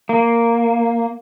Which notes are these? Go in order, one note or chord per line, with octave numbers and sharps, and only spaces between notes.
A#3